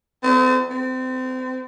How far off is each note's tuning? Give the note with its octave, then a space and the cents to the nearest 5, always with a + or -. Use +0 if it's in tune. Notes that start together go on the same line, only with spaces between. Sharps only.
C4 -40
C4 -30